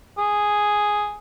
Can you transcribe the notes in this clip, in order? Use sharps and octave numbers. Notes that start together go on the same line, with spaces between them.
G#4